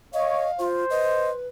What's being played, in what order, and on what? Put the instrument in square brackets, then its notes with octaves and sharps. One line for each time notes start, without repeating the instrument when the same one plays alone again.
[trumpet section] C#5 [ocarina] D#5 [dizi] F5
[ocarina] F4 [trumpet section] C5
[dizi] B4 [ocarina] D#5